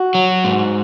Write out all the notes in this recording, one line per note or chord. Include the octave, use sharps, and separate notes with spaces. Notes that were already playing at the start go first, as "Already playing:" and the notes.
Already playing: F#4
F#3
G#2